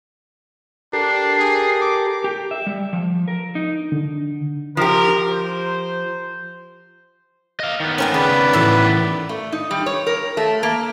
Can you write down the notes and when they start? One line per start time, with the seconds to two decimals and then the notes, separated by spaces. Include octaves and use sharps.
0.93 D4 G4 A4 A#4 C7
1.39 G#4
1.81 D6
2.24 G4
2.51 E5
2.67 G3
2.93 F3
3.28 A#4
3.55 D#4
3.92 D3
4.77 F3 G4 A#4
5.31 C5
7.60 D#5 F5
7.80 D#3 B3
7.98 C4 C#4 A#4 G5
8.14 C#3 B4 D5
8.53 A2 E3 F#4
9.29 A3
9.52 D#4
9.71 G3
9.86 C#5
10.07 A#4
10.37 A3
10.63 A#3